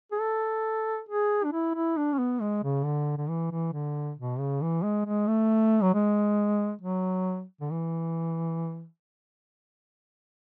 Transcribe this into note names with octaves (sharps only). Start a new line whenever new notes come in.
G#4
A4
G#4
D4
E4
E4
D4
C#4
B3
G#3
C#3
D3
D3
E3
E3
D3
B2
C#3
E3
G#3
G#3
A3
F#3
G#3
F#3
D3
E3